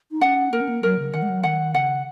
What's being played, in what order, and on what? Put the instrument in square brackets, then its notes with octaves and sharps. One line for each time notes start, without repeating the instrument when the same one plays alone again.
[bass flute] D#4
[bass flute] C#4 [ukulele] F#5
[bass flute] A#3 [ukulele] A#4
[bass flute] C#4
A#3
[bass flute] F#3 [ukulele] A#4
[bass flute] C#3
[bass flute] D#3 [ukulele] F#5
[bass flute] G#3
F#3
[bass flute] D#3 [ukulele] F#5
[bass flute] C#3 [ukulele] F#5